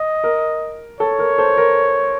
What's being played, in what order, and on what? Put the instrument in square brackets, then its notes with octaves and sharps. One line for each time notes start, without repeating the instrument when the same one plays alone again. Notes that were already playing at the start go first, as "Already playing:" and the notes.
Already playing: [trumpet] D#5
[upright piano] A#4
[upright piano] A4 [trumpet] C#5
[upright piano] A#4
A4 C5
A#4